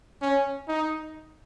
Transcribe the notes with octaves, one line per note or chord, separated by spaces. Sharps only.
C#4
D#4